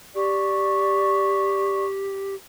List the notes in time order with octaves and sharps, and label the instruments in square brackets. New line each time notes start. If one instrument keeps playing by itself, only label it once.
[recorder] G4 [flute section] D5 C#6